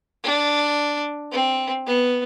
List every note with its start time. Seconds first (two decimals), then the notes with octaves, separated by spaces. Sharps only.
0.24 D4
1.32 C4
1.86 B3